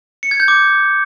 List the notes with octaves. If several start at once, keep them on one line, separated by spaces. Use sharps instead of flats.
C#7
G#6
G6
D6